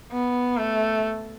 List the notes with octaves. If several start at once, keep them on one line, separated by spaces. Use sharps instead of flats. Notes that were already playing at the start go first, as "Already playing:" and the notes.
B3
A3